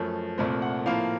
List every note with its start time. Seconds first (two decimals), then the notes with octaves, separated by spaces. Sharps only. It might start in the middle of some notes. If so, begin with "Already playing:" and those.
Already playing: F#2 F3 A3
0.38 C2 A#2 A3 C4
0.62 F#5
0.86 A2 F3 A#3 F5